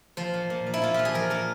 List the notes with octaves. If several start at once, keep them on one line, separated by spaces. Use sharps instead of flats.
F3 C5
A#2
A#2
F3
E4
A#2 F4
F3 G4
G#4
F3 A#4
A#2 A#4